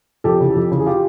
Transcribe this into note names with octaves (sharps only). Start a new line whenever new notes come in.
F2 G4 A4
C#3 E3
F2
C#3 E3
G#4
F4 G4